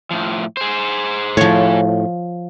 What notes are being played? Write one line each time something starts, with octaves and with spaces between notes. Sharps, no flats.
A2 F3
G#4 C5
A2 F3 C#5